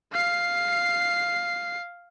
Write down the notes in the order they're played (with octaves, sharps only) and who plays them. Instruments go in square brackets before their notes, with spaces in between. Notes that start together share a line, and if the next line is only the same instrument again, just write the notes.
[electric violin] F5 C7